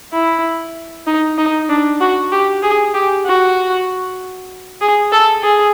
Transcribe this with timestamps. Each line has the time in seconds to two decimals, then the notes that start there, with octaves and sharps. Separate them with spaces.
0.13 E4
1.07 D#4
1.38 D#4
1.69 D4
2.00 F#4
2.32 G4
2.63 G#4
2.94 G4
3.26 F#4
4.81 G#4
5.12 A4
5.43 G#4